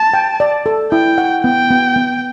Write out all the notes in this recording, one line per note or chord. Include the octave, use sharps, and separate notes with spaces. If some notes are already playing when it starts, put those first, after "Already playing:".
Already playing: A5
G5
D5
A4
E4 G5
F#5
B3 G5
B3
B3